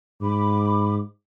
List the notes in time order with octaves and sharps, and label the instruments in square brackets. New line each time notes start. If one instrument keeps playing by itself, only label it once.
[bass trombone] G#2 [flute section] B5 D6